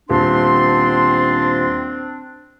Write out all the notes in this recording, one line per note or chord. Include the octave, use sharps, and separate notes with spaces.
D#1 C4 D4 C6